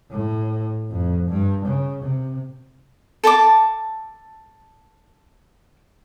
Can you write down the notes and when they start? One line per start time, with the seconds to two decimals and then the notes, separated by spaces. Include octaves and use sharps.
0.11 A2
0.90 F2
1.29 G2
1.66 C#3
2.03 C3
3.24 A4 A5 A#5 D6